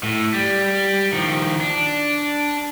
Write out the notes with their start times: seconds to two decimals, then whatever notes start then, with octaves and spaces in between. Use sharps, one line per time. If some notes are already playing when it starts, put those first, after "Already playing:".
0.03 A2
0.34 G3
1.13 D#3 F3
1.61 D4